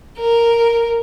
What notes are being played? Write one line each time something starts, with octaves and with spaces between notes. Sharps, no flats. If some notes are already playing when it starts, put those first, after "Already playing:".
A#4